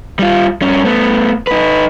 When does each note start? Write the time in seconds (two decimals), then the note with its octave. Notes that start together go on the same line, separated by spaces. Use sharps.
0.19 G3 F4
0.62 G2 C#4
0.85 A3 B3
1.47 D#4 B4